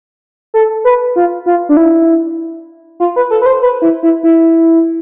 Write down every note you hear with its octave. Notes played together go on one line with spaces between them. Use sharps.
A4
B4
F4
F4
D4
E4
F4
B4
A4
B4
C5
B4
E4
E4
E4